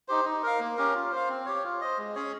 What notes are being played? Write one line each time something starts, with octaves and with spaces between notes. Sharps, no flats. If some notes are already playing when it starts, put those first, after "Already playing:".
D#4 G4 C5
D#4
A#4 F5
A#3
C#4 G4 A#4
F4
C5 F5
C4
G4 C#5
F4
C5 D#5
G#3
C#4 G#4 C#5